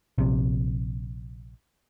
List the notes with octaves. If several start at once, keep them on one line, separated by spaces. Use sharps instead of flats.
A#1 C3